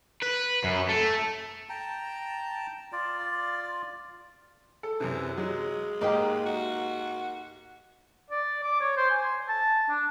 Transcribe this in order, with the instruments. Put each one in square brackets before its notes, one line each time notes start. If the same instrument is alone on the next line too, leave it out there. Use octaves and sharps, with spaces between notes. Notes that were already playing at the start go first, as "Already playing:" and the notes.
[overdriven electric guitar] B4
F#2
A3
[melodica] G5 A5 A#5
F4 D5
[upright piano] A4
[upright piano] F#2 C3 [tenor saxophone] E3
[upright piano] F#3 [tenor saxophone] G#3
[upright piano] G#2 A#4 [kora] A#3 D#4 G4
[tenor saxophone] F#4
[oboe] D5
D6
C#5
C5
G#5
A5
D4